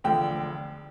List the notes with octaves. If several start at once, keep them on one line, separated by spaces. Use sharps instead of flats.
E1 D2 D3 F3 G5